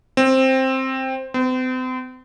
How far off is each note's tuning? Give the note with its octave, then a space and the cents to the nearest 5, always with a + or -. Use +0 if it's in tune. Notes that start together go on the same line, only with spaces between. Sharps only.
C4 +10
C4 -40